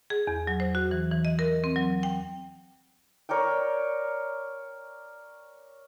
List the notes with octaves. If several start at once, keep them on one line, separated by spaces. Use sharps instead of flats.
G#4
E2
F#3
C5
F#4
E3
E3
D#5
A#4
C4
F#3
G5
A#4 C#5 D5 G5